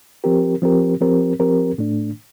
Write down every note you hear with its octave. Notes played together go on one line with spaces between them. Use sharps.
F3 C4 G4 A#4
F3 C4 G4 A#4
F3 C4 G4 A#4
F3 C4 G4 A#4
A2 A3 D4